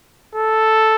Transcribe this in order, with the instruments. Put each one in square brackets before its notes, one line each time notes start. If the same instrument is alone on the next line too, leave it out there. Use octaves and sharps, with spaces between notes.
[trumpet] A4